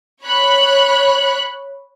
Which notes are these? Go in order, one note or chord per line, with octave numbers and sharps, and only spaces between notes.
C#5 B5 F#6